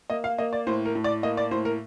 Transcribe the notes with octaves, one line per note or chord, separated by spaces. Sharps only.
A#3 D#5
F5
A#3 D#5
D5
A2 C5
A#4
A2
D5
A#3 D#5
D5
A2 C5
A#4